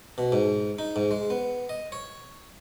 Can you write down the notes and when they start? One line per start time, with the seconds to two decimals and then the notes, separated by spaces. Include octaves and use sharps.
0.18 B2
0.32 G#2
0.79 D#4
0.96 G#2
1.11 G#3
1.30 B3
1.69 D#5
1.92 C#5